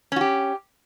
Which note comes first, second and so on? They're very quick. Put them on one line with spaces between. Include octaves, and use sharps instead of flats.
C#4 F#4 G4